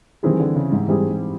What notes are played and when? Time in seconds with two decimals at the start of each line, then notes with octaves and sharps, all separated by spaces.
0.23 D#3 E3 G3 C4 E4 G#4
0.40 D3
0.56 C#3
0.72 G#2
0.88 G#2 E3 G3 C4 E4 G#4
1.10 G#2